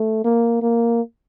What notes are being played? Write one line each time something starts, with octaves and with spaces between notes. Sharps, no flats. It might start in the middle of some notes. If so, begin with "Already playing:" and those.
Already playing: A3
A#3
A#3